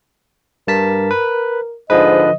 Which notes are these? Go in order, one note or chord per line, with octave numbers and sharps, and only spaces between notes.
G2 A#4 A5 B6
B4
G#2 D3 F3 B4 D#5